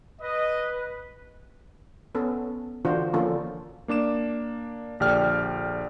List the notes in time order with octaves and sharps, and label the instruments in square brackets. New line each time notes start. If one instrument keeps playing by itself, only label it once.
[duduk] B4 [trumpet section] D#5
[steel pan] B3 C#4 A4
D3 E3 D4 F4 F#4 C5
D3 F3 A#3 C#4 F4 A4
[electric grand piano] A#3 D4 D6 E7
A#1 D3 G4 D5 G5 F6